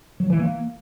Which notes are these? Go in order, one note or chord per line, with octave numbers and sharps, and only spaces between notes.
F#3
E3
A#3